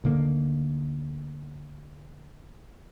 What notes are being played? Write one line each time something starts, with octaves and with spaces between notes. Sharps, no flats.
D2 D3 D#3 A#3